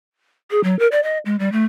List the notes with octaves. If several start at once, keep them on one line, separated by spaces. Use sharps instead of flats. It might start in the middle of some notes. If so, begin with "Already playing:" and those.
G#4
F#3
A#4
D5
D#5
G#3
G3
A3